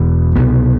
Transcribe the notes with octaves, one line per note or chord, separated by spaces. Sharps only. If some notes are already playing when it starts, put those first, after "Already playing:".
Already playing: E1 E2 B2
C2 B2 B3